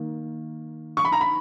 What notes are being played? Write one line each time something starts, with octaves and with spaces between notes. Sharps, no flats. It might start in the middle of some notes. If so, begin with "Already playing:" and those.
Already playing: D#3 A#3
C#6
B5
A#5
B5